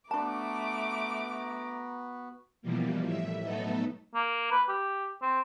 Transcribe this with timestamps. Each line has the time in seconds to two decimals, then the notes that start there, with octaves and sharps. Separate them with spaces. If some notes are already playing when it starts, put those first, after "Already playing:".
0.11 A3 B3 D4 F#4 B4 A5 A#5 D6
2.62 B2 E3 F3 G3 A#3
3.02 A2 E5
3.42 F#3 A3 B3 D#4 A4
4.15 A#3
4.51 B4
4.69 G4
5.22 C4